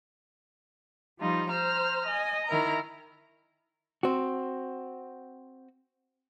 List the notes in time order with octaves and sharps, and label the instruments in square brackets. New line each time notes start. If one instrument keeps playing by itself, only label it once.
[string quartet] F3 G3 D#4 F4
C5 A#5 F6
D#5 G#5
D#3 E4 A#4 A#5
[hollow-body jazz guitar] C4 F#4